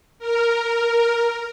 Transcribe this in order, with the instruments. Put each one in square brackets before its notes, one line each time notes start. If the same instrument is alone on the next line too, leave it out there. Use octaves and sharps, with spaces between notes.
[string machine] A#4